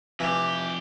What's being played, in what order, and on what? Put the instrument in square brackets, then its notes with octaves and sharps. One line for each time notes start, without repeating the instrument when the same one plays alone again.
[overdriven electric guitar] F2 G4 [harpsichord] E3